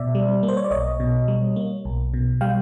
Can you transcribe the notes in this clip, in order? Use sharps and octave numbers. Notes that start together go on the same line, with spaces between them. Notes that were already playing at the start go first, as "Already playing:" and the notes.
Already playing: B2 D5 E5
G3
A#3
C5
C#5
D5
B1 C#5 D#5
B2
G3
A#3
B1
B2
G3 F5 G5